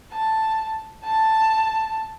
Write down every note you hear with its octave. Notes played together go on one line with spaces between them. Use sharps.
A5
A5